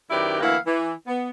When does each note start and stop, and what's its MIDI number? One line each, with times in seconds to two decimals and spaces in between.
0.11 0.37 42
0.11 0.37 51
0.11 0.37 64
0.11 0.37 67
0.11 0.37 71
0.11 0.37 74
0.41 0.56 38
0.41 0.56 52
0.41 0.56 58
0.41 0.56 64
0.41 0.56 77
0.41 0.56 78
0.66 0.93 52
1.07 1.29 59